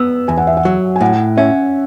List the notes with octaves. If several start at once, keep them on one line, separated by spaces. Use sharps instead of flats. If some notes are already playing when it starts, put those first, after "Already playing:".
Already playing: B3 E6
E2 G#5
F#5
E5
F#5
F#3
G#5
A2 F#5
C#4 E5